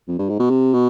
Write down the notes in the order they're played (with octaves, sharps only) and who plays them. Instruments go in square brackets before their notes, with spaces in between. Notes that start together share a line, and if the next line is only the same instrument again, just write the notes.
[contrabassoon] F2
G2
G#2
B2
C3
B2